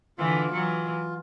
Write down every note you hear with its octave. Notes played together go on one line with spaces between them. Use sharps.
D3 E3 F4
E3 F#3